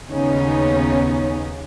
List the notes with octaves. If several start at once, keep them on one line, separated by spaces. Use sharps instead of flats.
D#2 C#3 B3 C#4 D#4